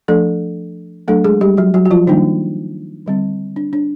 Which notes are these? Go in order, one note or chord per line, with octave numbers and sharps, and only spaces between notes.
F3 A3 D4 A4
F#3 A3 D4 A4
G#3 G#4
G3 G4
F#3 F#4
F#3 F#4
F#4
F3 F4
D#3 G3 A#3 D4 D#4
D3 G3 C4
D4
D4